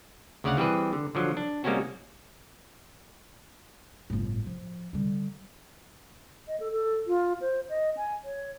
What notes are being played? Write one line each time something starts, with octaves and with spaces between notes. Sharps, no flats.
D2 C#3 D5 F5 F#5
E3 G3 C4 G#4 B4
D3
D3 F3 F#3
D4
G3 G#3 A#3 C4 C#4 F#4
G1 A2
F3
D3 G3
D#5
A4
A4
F4
C5
D#5
G#5
C#5